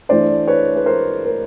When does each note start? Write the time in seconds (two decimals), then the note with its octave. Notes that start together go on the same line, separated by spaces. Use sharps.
0.09 E3 A3 D4 C5 D5
0.48 B4 C#5
0.76 B4
0.86 A#4 C5
1.25 A#4